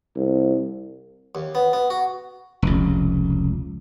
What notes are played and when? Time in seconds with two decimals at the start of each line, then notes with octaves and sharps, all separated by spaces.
0.16 C2
1.35 D#2
1.55 B3
1.73 B3
1.90 F#4
2.62 F1 C#2